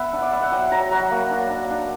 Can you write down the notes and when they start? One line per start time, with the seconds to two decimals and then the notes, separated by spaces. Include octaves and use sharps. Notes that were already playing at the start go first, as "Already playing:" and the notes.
Already playing: B3 E5 F#5
0.13 D4
0.21 D5
0.32 B3 E5
0.42 F#5
0.52 F#3 G5
0.71 F#3 A#5
0.91 F#3 F#5
1.11 A#3
1.31 D4
1.50 D4
1.70 D4